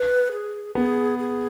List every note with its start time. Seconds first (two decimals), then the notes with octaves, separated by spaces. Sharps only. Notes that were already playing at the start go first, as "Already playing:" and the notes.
Already playing: B4
0.32 G#4
0.75 B3 G#4
1.19 G#4